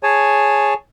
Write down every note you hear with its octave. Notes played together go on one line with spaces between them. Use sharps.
G#4 C#5 G#5 A5